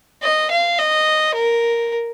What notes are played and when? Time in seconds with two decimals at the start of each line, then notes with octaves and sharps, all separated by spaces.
0.23 D#5
0.51 F5
0.79 D#5
1.35 A#4